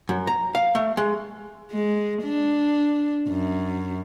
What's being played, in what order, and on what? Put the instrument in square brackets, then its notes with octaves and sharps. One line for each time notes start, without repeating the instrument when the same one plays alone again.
[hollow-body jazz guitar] F#2
A#5
F5
A3
G#3
[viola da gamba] G#3
D4
F#2